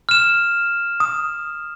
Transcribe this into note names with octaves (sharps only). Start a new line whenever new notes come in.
F6 E7
D#6